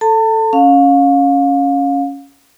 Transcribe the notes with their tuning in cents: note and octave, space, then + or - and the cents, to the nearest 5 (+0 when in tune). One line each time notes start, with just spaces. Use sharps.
A4 +0 A5 +35
C#4 +0 F5 +25